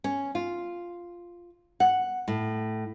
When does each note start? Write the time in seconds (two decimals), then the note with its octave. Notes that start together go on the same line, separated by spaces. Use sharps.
0.04 C#4
0.35 F4
1.80 F#5
2.28 A2